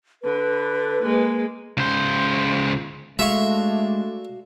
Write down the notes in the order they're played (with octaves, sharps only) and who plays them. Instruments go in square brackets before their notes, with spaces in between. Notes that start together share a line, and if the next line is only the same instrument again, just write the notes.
[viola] D3 [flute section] B4
[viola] G#3 A#3
[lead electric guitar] C#2 C5
[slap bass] G#3 [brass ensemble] A3 D4 [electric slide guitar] F#4 F5 [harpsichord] E5 C#6